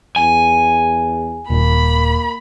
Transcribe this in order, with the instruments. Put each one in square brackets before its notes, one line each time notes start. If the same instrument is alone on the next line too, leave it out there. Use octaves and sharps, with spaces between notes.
[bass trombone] E2 [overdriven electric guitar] G#5
[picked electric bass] D#1 [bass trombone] A#3 [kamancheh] B5